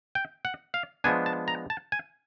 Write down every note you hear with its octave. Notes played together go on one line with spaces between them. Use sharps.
G5
F#5
F5
F3 G#3 B3 D4 G#5
A5
A#5
A5
G#5